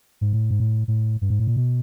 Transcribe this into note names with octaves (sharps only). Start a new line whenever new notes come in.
G#2
A2
G#2
A2
A2
G2
G#2
A2
A#2
B2